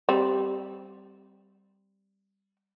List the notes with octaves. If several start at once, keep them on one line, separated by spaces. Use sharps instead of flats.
G3 C4